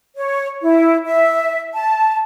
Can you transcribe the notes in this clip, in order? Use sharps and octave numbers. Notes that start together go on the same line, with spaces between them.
C#5
E4
E5
A5